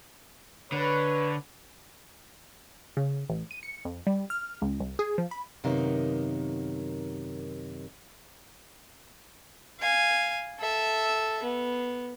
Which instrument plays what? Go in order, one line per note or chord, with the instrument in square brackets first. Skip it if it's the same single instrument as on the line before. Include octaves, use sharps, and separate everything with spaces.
[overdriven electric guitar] D3 [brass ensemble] B4 C#5
[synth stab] C#3
A1
D#7
C#7
F2
G3
F6
C#2
C2
G#4
F3
B5
[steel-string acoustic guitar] F#2 C3 D#3 A#3 B3 D#4
[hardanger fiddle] F5 G#5
A4 E5
B3